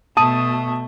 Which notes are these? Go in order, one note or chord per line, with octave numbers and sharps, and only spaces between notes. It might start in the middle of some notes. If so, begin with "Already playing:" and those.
B2 A3 A5 D#6 D#7